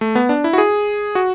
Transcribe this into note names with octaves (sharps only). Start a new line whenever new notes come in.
A3
B3
D4
E4
F#4
G#4
F#4